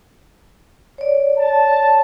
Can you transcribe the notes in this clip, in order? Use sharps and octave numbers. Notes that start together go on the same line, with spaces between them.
C#5 D5
A5